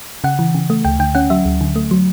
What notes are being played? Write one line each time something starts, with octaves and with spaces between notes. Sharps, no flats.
C#3 F#5
E3
C#3
A3
D2 G5
D3 G5
C#4 F#5
F#3 E5
D2
D3
A3
F#3